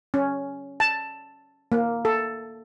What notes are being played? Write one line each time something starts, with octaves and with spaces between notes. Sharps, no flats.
C#4
A5
A#3
A4